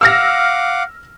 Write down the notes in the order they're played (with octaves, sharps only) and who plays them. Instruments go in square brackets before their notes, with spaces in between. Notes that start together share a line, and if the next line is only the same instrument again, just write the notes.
[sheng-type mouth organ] F5 F#5 D6 [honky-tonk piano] E6 F6 A#6